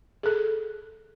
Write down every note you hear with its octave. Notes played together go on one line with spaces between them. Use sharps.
G#4 A4